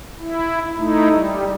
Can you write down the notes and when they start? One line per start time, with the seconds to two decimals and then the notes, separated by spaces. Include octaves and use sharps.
0.20 E4
0.77 A3 D#4 E4
1.09 G3